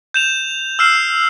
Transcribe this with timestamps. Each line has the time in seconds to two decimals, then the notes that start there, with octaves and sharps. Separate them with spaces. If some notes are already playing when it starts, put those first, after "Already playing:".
0.14 G6 E7 F7
0.79 E6 F6 C7 E7